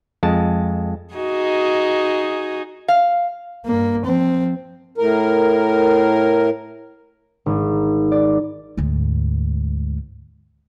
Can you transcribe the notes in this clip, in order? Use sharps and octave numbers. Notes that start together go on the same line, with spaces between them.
F2 G#3 A5
D#4 F#4 G#4
F5
G2 A#3
F3 C4
A2 A#4
G#1
D5
D2 G#2